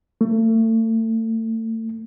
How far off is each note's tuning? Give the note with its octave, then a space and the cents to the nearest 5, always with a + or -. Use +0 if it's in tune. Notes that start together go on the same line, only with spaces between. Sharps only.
A3 +35